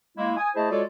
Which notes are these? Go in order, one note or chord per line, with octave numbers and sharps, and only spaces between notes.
G#3 A#3 E4
G#5 D#6
A3 E4 G#4 C5 D#5 A5
G#3 F4 F#4 A4 C#5 D5